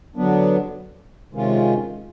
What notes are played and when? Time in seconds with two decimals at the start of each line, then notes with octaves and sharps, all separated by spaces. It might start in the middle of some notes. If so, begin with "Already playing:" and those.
0.16 D3 F#3 B3 D4
1.33 C3 D#3 G#3 C#4 F4